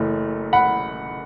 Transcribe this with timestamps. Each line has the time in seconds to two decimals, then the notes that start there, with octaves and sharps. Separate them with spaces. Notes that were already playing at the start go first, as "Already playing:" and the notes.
Already playing: F#1 F#2 E3 A3
0.53 F#5 B5